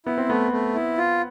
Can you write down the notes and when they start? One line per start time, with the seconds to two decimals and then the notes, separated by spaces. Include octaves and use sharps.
0.06 B3 E4
0.18 C4
0.29 A3 B3
0.52 A3
0.75 E4
0.98 F4